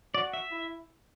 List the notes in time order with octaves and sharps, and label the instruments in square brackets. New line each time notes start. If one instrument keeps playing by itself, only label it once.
[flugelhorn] F#4 [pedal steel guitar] D5
[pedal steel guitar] E5
[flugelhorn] E4